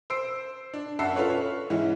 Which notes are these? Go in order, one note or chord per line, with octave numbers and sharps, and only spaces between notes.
C5 E6 C7 D7
D4
F#2 E5 F#5 A5 C7
F4 A4 B4 C#5 F#6
C#5
G#2 E3 C#4 E4